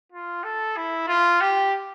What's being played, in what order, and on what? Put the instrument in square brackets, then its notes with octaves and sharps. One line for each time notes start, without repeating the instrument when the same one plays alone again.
[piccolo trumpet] F4
A4
E4
F4
G4